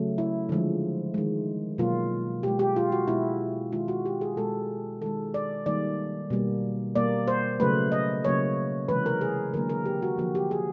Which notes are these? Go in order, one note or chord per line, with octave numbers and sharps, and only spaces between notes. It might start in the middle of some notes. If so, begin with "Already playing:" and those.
Already playing: C#3 F#3 A3
E4
D3 F3 G#3
D#3 G#3
B2 F#3 A#3 F4
B2 G#3 G4
G4
F4
F#4
B2 G#3 E4
D#3 G#3 F4
F#4
G4
G#4
B2 G#3 A4
D#3 G#3 A4
D5
D#3 G3 A#3 D5
B2 G3 A#3
B2 G3 A#3 D5
C5
C#3 F#3 A3 B4
D#5
C#3 F#3 A#3 C#5
C3 E3 G#3 B4
A#4
G#4
D3 F#3 A#3 A#4
A#4
G4
F#4
D3 F3 A#3 F#4
G4
G#4